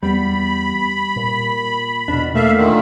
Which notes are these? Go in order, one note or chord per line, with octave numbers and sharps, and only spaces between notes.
E2 G3 B3 B5
A#2
E2 B2 D4
A3 A#3 E5 F5
A#2 D3 D#3